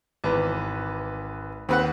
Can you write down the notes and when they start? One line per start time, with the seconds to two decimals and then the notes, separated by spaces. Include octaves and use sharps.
0.24 G#1 E2 B4
1.69 D#2 C4 B4 F#5